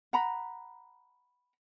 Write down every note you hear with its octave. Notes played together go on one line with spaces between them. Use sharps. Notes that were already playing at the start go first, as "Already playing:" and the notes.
F#5 A#5 B5